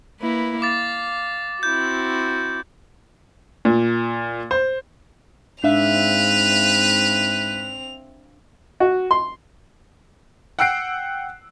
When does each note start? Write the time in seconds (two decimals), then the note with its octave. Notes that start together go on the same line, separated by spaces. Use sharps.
0.21 A#3 E4 B4
0.62 F5 D6 A6
1.63 C4 E4 F#4 G6
3.65 A#2
4.51 C5
5.64 G#2 C4 D4 B4 E5 F5 F7
8.80 F#4
9.11 C6
10.59 F#5 G5 E6 F#6 C7 D7